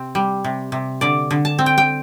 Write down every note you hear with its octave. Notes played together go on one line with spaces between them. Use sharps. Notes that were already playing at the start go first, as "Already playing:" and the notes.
Already playing: C3 C4
G3
C3
C3
D3 D5
D3
A5
C4
G5
G5